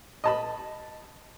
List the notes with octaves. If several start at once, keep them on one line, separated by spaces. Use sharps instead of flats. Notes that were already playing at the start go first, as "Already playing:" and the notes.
D#5 A5 B5